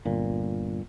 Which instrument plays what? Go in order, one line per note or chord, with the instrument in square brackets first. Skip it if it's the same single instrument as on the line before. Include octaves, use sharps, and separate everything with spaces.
[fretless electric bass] G1 A#2